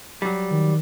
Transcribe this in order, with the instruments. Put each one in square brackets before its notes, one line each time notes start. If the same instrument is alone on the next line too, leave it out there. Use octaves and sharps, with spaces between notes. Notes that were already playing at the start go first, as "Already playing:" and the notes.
[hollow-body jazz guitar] F#3 G3
[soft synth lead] D#3